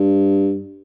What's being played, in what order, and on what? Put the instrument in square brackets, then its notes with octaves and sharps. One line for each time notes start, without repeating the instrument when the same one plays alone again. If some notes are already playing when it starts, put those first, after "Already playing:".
Already playing: [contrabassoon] G2